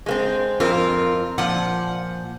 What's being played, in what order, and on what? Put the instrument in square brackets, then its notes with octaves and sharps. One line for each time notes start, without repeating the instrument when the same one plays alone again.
[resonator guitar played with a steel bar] G#3 A#3 C4
[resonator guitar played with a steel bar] F2 C4 A#4 [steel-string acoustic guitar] F4
[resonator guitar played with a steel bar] A#2 F3 [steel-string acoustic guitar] F#5